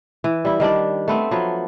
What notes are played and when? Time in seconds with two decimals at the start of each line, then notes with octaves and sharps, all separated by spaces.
0.24 E3
0.45 G3 E4
0.60 D#3 G3 D4 D5
1.08 A3 B3 C4
1.31 F3 F#3 B3